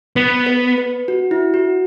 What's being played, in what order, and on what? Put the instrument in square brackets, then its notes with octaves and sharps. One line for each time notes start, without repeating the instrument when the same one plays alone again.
[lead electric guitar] B3 [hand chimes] B4
[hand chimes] B4
B4
F#4
E4
F#4